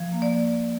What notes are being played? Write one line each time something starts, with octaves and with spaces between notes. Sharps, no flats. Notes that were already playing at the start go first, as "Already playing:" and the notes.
Already playing: F3
A#3
D5